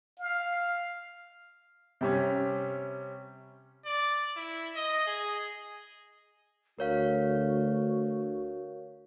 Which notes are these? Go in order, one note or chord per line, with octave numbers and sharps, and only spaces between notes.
F5
C3 G3 C#4
D5
E4
D#5
G#4
D2 F#4 A#4 C#5 F5